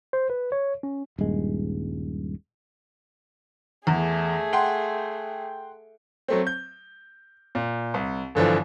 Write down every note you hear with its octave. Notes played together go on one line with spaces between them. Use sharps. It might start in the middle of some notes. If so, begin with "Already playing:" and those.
C5
B4
C#5
C#4
D#1 G2 G#3
E2 A3 G#4
F#5 G5 C6
F#3 A3 C4
G6
A#2
C2
G1 D3 E3 F3